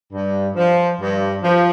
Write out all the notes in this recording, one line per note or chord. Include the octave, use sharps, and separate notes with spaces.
G2
F3
G2
F3